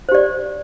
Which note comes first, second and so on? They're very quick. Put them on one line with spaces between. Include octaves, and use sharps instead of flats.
C5 G4 D5